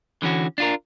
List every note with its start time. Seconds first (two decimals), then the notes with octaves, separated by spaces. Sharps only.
0.22 D3 E3 C#4 F#4
0.58 D4 F4 A#4